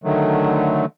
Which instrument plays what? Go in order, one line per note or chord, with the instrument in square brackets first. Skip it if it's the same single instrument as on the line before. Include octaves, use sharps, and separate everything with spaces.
[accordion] D3 D#3 F#3 A3